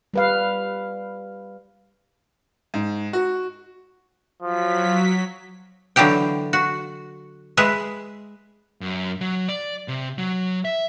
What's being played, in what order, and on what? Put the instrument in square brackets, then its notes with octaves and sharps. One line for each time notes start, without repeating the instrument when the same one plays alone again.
[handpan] G3 B4 F5
[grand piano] G#2
F#4
[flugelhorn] F3 [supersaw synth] F#3 B6
[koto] D3 E3 F#3 G4 G5
F#4
G#3 B4 E5
[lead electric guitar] F#2
F#3
D5
C3
F#3
E5